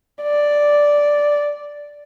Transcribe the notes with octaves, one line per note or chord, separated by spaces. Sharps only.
D5